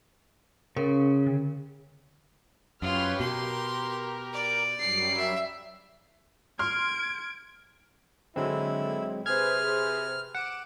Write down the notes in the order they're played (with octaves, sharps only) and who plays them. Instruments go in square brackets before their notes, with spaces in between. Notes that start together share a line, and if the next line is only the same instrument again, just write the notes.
[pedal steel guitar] C#3 [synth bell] C#4 A#4
[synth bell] D3
[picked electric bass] F#2 [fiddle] F4 [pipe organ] G4 B4 C#5 [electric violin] C6 F6
[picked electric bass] B2 [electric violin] G4 [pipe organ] A#4 [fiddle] C6
[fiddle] D5
[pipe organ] F#2 F#3 G3 [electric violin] C7
[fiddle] E5
[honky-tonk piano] C6 F6 [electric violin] G#6 D7
[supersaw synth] D3 [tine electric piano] F#3 G#3 C4 [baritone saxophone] E4
[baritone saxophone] C3 [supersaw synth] G#4 B4 C5 [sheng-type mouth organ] F6 [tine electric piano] G#6
[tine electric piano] F#5 [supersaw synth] D6 D7 E7